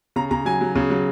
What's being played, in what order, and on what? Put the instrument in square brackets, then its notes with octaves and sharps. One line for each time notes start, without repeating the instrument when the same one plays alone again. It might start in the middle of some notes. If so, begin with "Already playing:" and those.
[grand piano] C#3 A#5
C#3 A#5
F#3 G#5
F#3
C#3
F#3